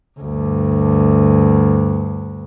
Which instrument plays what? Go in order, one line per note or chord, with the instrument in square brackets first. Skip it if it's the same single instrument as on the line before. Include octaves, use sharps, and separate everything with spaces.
[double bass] D2 G2